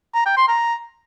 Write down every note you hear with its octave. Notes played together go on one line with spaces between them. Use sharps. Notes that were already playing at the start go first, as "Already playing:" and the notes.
A#5
G5
C6
A#5